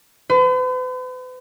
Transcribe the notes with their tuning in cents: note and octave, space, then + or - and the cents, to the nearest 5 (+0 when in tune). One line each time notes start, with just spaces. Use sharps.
B4 +45